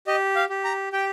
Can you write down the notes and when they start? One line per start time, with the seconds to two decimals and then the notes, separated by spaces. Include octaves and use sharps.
0.07 G4 D#5
0.36 F5
0.50 G4
0.64 A#5
0.93 G4 G5